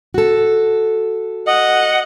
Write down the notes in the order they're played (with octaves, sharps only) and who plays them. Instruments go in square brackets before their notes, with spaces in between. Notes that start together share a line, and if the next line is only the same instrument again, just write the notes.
[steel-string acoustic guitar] F#4 A4
[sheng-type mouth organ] D#5 [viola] F#5